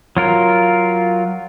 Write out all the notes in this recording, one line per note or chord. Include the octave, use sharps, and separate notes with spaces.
F#3 F4 A#4